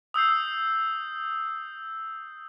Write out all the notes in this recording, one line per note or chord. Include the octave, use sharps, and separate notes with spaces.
D#6 E6 G6 C7